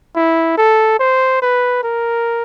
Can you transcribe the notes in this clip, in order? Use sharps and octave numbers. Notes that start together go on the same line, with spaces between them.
E4
A4
C5
B4
A#4